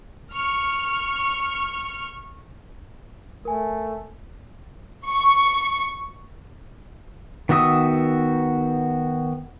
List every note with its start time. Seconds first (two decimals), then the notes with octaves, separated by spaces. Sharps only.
0.33 C#6 F6
3.45 A3 A#4 G#5
5.09 C#6
7.49 D#3 B3 F#4 E5 D#6